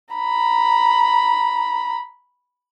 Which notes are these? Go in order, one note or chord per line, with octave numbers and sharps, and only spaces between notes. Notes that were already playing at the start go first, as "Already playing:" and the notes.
A#5 B5